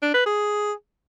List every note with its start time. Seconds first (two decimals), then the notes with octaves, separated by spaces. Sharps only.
0.02 D4
0.14 B4
0.26 G#4